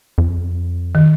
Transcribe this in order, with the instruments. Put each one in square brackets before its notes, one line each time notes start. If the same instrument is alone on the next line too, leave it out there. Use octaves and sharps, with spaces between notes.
[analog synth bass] F2
[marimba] D#3